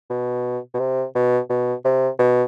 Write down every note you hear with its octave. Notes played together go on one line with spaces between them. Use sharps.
B2
B2
C3
B2
B2
C3
B2